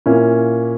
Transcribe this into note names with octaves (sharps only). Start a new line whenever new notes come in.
A#2 A#3 C#4 E4